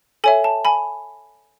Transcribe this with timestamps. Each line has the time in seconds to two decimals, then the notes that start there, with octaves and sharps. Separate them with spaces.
0.24 A4 C#5 E5 G#5
0.44 A5
0.65 G#5 B5